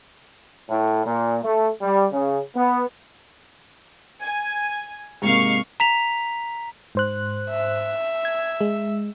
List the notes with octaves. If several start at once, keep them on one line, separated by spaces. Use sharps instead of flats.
A2
A#2
A3
G3
C#3
B3
G#5
G#2 C3 A#3 D#5 F5 C#6
A#5 B6 F7
G#2 C5 F#6
E5
G#6
G#3